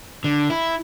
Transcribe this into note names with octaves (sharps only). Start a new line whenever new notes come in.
D3
E4